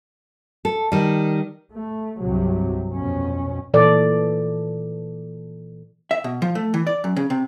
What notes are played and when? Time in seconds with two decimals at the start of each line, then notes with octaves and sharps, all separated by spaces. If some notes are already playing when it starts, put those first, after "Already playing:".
0.65 A4
0.92 D#3 G3
1.72 A3
2.20 C2 G2 C3 F#3
2.92 F2 B2 C#4
3.74 A#2 E3 A4 D5
6.11 E5
6.24 B2
6.42 F3
6.55 A3
6.74 E3
6.87 D5
7.04 F#2
7.16 C#3
7.30 C3